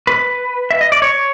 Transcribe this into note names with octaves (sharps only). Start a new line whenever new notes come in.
B4
E5
D#5
D5
C#5